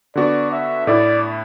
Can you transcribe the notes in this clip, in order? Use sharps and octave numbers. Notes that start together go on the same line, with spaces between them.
D3 B3 F#4 D5
E5
A2 A3 E4 D5